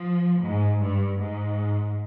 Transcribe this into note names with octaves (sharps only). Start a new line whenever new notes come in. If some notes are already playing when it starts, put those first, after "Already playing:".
Already playing: F3
G#2
G2
G#2